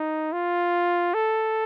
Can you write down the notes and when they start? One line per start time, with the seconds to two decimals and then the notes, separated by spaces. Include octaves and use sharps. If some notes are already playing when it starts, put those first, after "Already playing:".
Already playing: D#4
0.32 F4
1.14 A4